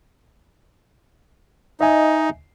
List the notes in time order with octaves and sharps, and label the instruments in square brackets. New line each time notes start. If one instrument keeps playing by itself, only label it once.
[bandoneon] D#4 [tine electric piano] D#5 E5 G#5